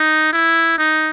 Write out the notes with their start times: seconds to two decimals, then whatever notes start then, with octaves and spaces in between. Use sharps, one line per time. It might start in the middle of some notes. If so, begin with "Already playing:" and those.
Already playing: D#4
0.33 E4
0.78 D#4